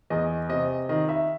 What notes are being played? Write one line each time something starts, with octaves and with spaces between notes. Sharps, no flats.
E2 D#5
C3 D#5
D#3 D#5
E5